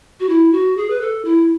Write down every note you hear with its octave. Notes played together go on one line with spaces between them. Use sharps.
F#4
E4
F#4
G#4
B4
A4
E4